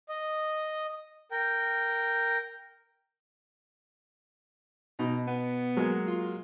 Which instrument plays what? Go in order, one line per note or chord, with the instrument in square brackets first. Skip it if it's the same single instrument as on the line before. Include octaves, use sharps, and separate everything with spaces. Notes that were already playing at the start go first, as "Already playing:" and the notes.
[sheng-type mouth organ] D#5
A#4 G5
[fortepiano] B2 [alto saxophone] D#4
[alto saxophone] B3
[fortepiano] F#3 G#3 A#3
[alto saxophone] F4